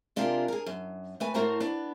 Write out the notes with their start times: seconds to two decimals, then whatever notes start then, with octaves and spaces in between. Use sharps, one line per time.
0.16 C3 D4 F4 G4 G#4 A#4
0.48 G#4 A#4
0.66 F#2
1.20 A3 B4 G#5
1.34 A2 A3 F#4 A#4 C5 A#5
1.60 B3 D4